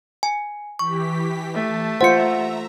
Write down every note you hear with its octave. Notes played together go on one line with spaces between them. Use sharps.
G#5
E3 G4 C#6 B6
A3 A5
F4 C5 E5 F#5 A#5 C#7